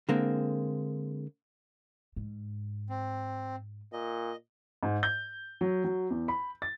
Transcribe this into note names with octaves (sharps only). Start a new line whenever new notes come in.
D3 G#3 A#3 C4
G#2
C4
A#2 D#5
G#2
G6
F#3
F#3
E2
B5
A6